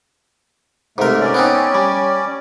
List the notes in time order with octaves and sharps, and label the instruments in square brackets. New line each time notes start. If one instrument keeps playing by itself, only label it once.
[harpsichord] G#2 A#4 [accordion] C3 A3
[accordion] C#4 D5
[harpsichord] B3 C4 D#4
G3